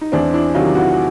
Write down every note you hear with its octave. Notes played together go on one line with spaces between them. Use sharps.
D#4
E2 C4 D4
D4 E4
C3 D#3 F#3 D#4 F4
E4 F#4